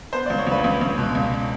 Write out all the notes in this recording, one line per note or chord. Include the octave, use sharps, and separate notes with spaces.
B3 C5
C#2 D5
C#5
C#2 B4
C#2
C#2
B2
C#2